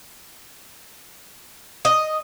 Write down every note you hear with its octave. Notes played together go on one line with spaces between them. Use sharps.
D#5